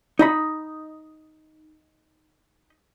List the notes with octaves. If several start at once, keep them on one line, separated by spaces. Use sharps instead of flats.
D#4 D#5 B5